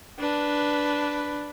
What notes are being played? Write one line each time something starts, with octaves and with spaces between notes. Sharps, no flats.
D4 B4